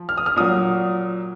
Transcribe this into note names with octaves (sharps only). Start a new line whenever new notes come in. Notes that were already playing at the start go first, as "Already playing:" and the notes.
Already playing: F3
F6
D#6
F6
A#2 F#3 D#6